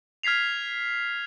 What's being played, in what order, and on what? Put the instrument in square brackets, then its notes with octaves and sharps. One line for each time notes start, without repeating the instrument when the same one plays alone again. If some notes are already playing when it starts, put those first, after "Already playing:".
[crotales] F6 G#6 B6 C7 F7